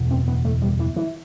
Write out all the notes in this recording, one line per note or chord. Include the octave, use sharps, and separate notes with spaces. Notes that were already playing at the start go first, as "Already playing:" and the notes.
Already playing: F#1 E2 B2
C4
B3
A3
G3
E3
E3